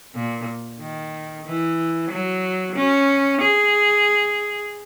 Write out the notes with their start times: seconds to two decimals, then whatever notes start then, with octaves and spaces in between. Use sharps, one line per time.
0.15 A#2
0.80 D#3
1.46 E3
2.11 F#3
2.75 C#4
3.41 G#4